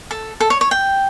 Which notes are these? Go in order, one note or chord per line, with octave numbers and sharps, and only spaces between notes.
A4
A4
C#5
C#5
G5